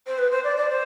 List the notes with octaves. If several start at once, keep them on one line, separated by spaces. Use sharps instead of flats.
C5
B4
C5
D5
D5
C5